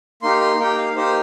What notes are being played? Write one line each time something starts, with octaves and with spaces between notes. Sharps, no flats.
A#3 D#4 G4 C6
C6
A#3 D#4 G4 G5
F5
A#3 D#4 G4 C5